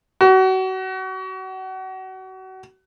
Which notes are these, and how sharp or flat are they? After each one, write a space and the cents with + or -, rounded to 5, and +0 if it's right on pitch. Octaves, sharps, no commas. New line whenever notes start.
F#4 +30